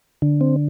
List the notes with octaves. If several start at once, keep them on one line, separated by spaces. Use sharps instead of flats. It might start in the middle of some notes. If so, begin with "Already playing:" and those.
D3
C4